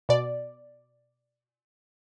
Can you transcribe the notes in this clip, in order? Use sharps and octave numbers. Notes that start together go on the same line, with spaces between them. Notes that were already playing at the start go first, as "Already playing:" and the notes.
B2 D5